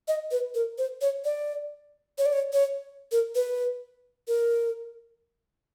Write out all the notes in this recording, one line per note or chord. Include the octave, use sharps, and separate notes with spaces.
D#5
B4
A#4
C5
C#5
D5
C#5
D5
C#5
C#5
A#4
B4
A#4